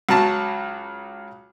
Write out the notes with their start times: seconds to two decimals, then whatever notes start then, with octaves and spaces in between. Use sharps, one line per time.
0.09 C#2 F#3 A5 A#5